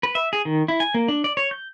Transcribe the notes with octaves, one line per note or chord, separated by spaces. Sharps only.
B4
E5
G#4
D#3
E4
G#5
A#3
D4
D5
C#5
G6